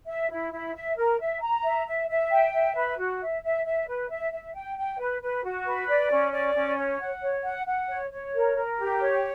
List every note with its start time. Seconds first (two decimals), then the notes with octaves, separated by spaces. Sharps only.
0.06 E5
0.30 E4
0.52 E4
0.74 E5
0.96 A#4
1.19 E5
1.41 A#5
1.63 E5
1.86 E5
2.08 E5
2.30 G5
2.52 E5
2.74 B4
2.98 F#4
3.20 E5
3.42 E5
3.64 E5
3.87 B4
4.09 E5
4.31 E5
4.54 G5
4.76 G5
4.98 B4
5.21 B4
5.43 F#4
5.65 B4
5.87 D5
6.10 C#4
6.32 D5
6.55 C#4
6.77 C#5
6.99 F#5
7.21 C#5
7.43 F#5
7.66 F#5
7.88 C#5
8.11 C#5
8.33 A#4
8.56 A#4
8.78 G4
9.00 C#5